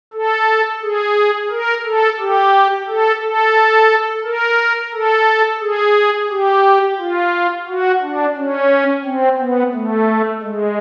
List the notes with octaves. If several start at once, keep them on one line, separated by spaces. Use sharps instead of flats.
A4
G#4
A#4
A4
G4
A4
A4
A#4
A4
G#4
G4
F4
F#4
D4
C#4
C4
B3
A3
G#3